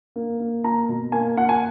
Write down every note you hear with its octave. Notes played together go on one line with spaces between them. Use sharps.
A#3
A#3
A#3 A#5
B2
A#3 G#5
A#3 F#5
G#5